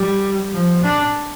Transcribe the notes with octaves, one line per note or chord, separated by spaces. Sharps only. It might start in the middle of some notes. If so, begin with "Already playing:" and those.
Already playing: G3
F3
D4